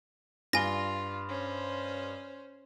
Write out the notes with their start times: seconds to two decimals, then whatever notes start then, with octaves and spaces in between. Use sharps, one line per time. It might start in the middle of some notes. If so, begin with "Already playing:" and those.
0.53 G2 F4 G#5 A#6 G7
1.28 C#4 C5